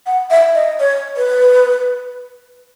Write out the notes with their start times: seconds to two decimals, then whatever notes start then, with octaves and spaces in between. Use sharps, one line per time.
0.07 F#5
0.31 E5
0.55 D#5
0.80 C#5
1.17 B4